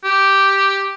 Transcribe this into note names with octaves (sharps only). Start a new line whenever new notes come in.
G4